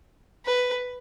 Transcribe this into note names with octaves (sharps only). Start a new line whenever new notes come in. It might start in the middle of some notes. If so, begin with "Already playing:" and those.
B4